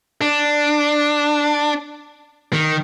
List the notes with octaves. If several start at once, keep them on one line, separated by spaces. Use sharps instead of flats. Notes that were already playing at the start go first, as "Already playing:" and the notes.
D4
D#3